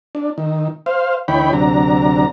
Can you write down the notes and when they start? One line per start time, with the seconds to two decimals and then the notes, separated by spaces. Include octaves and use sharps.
0.15 D4
0.38 D#3
0.86 C5 F5
1.28 D2 E3 D#4 C#5 G5 B5
1.53 D2 C3 F#3 D4 A#5